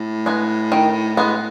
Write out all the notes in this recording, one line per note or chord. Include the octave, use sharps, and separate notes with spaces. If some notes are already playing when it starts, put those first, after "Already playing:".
Already playing: A2
G#3 B3
D#3
G#3 B3